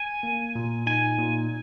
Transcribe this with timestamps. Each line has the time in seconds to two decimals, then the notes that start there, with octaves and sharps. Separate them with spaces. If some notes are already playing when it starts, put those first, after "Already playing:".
Already playing: G#5
0.23 A#3
0.55 A#2
0.86 D#4 G#5
1.18 A#2